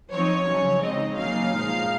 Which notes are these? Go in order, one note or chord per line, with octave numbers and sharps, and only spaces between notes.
F3 C4 D#4 C#5
C#3 F#3 C#4
C#3 G#3 C4 D#4 D#5
C#3 F#3 A#3 D#4 F5
A#2 F3 G#3 D#4